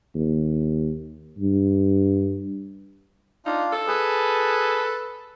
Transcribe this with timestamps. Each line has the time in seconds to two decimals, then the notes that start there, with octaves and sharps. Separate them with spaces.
0.15 D#2
1.39 G2
3.46 D4 D#4 F4 F5
3.73 A4 A5
3.88 G#4 B4